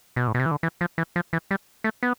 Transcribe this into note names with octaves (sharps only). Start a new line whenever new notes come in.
B2
A2
B2
C3
E3
D3
E3
F3
E3
F3
E3
G3
A3
B3